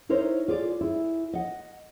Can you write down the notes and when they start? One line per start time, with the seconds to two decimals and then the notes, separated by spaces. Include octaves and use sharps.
0.09 D#4 E4 A#4 C5 C#5 D#5
0.48 F4 G#4 C#5 D5
0.81 E4 G#4
1.33 D#5 F#5